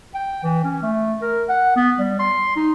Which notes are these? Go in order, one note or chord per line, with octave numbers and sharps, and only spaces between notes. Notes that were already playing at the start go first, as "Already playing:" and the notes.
G5
E3
C#4
A3
A#4
F#5
B3
G3
C6
D#4